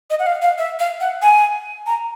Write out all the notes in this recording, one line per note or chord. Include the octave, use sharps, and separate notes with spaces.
D#5
F#5
F5
F5
E5
F5
F#5
G#5
A#5